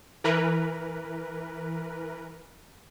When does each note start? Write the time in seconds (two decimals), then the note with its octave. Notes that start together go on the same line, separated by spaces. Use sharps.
0.24 E3 A#4 B4